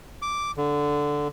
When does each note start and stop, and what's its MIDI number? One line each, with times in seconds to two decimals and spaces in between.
0.22 0.51 86
0.57 1.28 50